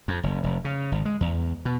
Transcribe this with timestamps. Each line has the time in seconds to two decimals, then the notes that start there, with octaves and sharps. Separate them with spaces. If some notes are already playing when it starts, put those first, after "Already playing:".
0.08 F2
0.23 F#1
0.44 F1
0.65 C#3
0.92 G#1
1.05 G#3
1.21 E2
1.65 B2